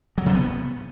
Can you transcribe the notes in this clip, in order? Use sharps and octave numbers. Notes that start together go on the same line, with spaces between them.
F#3
C3
B3